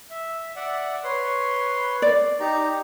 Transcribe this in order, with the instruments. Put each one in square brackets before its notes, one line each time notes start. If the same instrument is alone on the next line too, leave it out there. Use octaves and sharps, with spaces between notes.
[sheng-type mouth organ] E5
D5 E5 F#5
B4 C#5 C6
[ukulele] D5
[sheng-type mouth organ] D#4 G4 A#5